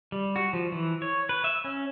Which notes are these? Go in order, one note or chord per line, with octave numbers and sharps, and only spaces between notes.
G3
F#4
F3
E3
C#5
B4
E5
C#4